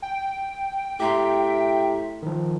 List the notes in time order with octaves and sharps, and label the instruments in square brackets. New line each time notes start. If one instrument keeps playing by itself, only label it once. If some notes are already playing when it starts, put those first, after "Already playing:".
[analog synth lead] G5
[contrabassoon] A2 [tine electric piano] G4 A#5 C6 [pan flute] E5
[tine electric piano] D#3 F3